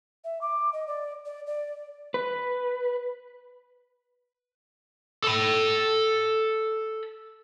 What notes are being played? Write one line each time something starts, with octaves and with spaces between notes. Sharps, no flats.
E5
D6
D#5
D5
D5
D5
B4
A4 B5